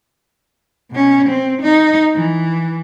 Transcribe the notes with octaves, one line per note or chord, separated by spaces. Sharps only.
B2 C#4
C4
D#4
E3